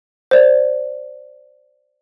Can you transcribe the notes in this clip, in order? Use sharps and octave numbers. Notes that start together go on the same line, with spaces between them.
C5 D5